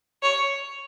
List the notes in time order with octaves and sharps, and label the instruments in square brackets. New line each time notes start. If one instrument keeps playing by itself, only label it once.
[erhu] C#5